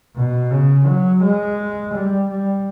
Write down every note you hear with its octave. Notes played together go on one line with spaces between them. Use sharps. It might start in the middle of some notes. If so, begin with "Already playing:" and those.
B2
C#3
F#3
G#3
G3
G3